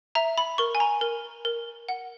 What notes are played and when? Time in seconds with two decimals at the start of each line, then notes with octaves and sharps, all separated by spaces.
0.15 E5 A#5
0.38 B5
0.58 A#4 C#6
0.75 G#5
0.80 A#5
1.01 A#4
1.45 A#4
1.89 F#5